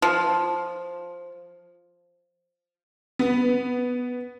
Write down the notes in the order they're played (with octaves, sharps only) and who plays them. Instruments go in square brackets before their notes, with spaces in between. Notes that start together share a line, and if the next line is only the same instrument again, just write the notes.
[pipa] F3
[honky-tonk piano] B3